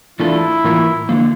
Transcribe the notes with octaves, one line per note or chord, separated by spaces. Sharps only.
E3 A3 D4 E4 F4 A4
A2 E3 A#3 F4 A#4
D3 F3 A#3